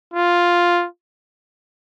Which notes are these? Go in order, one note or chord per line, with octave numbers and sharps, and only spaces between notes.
F4